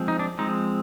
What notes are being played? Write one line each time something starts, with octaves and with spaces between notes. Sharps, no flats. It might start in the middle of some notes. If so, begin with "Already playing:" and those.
Already playing: F3 G#3 C4
D#4
D4
F3 G#3 C4 D#4